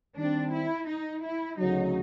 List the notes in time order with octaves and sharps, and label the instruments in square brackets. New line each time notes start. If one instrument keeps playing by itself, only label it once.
[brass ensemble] D#3 G3 C4 [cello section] D4
[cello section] E4
D#4
E4
[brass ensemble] D2 C#3 F#3 [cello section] D#4